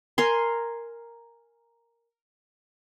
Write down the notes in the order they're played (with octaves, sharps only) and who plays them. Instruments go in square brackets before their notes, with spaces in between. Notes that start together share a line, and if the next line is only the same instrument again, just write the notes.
[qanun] A#4 G#5 C6